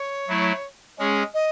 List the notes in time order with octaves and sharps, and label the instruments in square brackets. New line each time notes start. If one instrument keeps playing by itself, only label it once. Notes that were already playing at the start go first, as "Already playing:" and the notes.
Already playing: [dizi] C#5
[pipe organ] F#3 A3 E4
[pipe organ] G#3 C#4 G#4 [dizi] C#5
[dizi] D#5